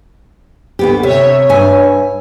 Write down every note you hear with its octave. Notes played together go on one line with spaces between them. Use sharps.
D2 B3 G4
C3 C#5 E5
G2 G#5